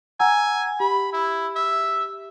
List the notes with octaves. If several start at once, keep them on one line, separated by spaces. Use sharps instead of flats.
F#5 G#5 A#5 E6
G4 B5
E4
E5